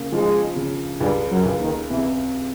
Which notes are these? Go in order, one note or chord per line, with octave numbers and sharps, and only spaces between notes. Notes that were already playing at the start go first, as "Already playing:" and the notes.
Already playing: C#3 A#3
G#2 F3 G#3
C#3
C#2 G2 G3
F#2 F#3
C#2
D#2 D#3
E2 C3 E3